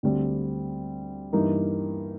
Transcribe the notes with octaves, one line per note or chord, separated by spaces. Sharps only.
D2 D3 G3 C4
G2 E3 G3 A#3 D#4